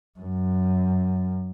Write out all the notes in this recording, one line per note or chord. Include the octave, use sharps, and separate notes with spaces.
F#2